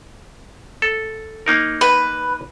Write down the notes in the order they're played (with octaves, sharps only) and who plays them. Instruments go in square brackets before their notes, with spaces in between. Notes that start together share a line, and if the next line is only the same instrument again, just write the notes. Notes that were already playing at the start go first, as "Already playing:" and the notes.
[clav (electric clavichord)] A4
A#3 D#4 A#4
[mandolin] B4